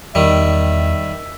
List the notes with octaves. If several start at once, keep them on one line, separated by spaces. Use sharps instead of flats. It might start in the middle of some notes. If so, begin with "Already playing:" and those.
E2 D#3 G3 E5